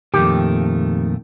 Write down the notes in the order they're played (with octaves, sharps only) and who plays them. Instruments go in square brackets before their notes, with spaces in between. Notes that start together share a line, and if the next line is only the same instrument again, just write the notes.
[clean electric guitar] F2 D#3 [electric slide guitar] A#2 A3 [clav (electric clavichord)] G4